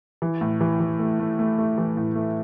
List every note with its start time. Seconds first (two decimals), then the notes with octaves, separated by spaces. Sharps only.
0.22 E3
0.41 A2
0.61 E3
0.80 E3
0.99 A3
1.20 A3
1.39 A3
1.58 A3
1.78 E3
1.97 A2
2.15 A3